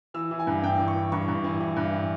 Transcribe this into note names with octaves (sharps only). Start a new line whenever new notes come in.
E3 E6
E3
G#5
G2
G2 G5
E3
C#6
E3
G2 C#6
G2
E3
E3
G2